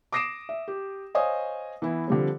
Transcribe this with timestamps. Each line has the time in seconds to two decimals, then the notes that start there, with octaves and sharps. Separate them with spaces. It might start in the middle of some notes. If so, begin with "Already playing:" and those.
0.12 D6 D#6 A#6 C7 D7 E7
0.49 E5
0.68 G4
1.15 C5 C#5 D#5 F5 G#5 D#6
1.82 E3 B3 E4
2.08 D3 F3 G3 C4